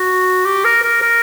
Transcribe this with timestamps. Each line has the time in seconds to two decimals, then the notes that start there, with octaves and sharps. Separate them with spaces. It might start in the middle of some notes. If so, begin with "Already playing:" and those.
Already playing: F#4
0.46 G4
0.65 A#4
0.83 A#4
1.02 A#4